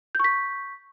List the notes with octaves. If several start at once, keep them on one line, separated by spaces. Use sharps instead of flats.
C#6 G6 B6